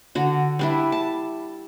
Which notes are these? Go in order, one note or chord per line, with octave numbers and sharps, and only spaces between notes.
D3 F#4
G3 D4 E4
A5